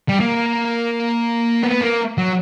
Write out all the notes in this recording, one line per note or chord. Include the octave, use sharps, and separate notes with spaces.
G3
A#3
B3
A#3
F#3